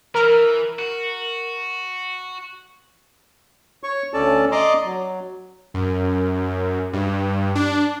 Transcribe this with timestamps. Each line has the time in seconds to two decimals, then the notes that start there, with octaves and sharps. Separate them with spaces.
0.15 E3 A#4
0.79 F#4
3.83 C#5 C#6
4.14 D2 C#4 A4 D5 A5
4.52 D5 D#5 A#5 C6 D6
4.86 F#3
5.74 F#2
6.93 G2
7.55 D4